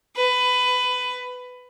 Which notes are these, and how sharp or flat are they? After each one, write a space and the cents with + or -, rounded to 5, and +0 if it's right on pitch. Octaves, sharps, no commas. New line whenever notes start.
B4 +15